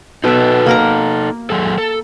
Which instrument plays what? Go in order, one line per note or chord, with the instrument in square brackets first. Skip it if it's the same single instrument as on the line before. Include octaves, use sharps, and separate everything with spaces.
[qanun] B2 E5 [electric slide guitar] D#4 A4
[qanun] A#3 A#4 A#5
[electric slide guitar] F#3 G#4 A4
A4